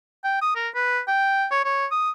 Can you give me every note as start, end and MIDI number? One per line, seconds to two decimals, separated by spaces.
0.24 0.41 79
0.41 0.53 87
0.55 0.69 70
0.75 1.00 71
1.08 1.46 79
1.51 1.63 73
1.65 1.86 73
1.91 2.11 87